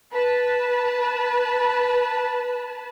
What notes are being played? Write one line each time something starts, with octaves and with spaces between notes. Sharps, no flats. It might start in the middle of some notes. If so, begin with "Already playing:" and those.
B4 A5